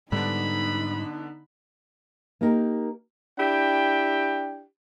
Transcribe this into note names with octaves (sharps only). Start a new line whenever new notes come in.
G#2 D3 G3 B3 D4 D#4 B5
A#3 D#4 G4 A#4
D4 E4 G4 G5